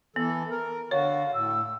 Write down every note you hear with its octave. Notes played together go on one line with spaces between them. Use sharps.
E3 B3 A4
A#4
D3 F#4 C#5 F5
A2 E6